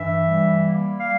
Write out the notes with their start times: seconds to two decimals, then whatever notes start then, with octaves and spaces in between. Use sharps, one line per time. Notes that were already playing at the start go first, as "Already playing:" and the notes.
Already playing: G2 E3 E5
0.27 G3
0.64 A#3
0.99 G3 F5